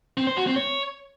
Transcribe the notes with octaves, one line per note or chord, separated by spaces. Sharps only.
C4
C5
F#4
C4
C#5